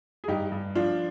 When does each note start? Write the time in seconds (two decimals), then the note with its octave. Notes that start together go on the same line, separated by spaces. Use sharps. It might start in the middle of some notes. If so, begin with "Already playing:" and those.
0.24 G#4
0.28 G2 D#4 G4
0.52 G2
0.75 F3 D4 F4